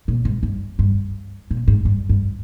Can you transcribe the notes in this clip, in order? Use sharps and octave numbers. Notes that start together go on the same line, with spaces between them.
A#2
G#2
G2
G2
A#2
G#2
G2
G2